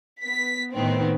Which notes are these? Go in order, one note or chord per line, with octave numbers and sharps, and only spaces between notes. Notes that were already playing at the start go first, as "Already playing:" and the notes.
B3 B6
A2 D#3 B3 C4